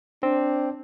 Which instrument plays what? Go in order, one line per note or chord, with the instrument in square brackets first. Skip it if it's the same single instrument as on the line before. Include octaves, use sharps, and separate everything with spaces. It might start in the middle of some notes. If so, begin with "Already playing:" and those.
[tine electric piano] C4 [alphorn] D4